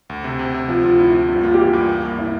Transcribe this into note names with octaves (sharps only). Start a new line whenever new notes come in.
D2
C3
C3
C3
F3 F4
D2 F4
D2 E4
D2
G2 F4
A#3 F4
G4
E3 F4
G2
A#3
G2
E4